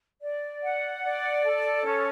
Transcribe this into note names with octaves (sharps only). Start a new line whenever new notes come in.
D5
F#5
D5
A4
C#4